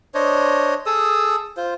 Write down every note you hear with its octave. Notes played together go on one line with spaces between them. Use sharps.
D4 C5 C#5 D#5
G#4 A4 D#6 E6
F4 C5